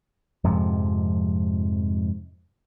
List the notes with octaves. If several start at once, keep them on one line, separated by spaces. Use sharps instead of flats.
F2 G#2 C3 F3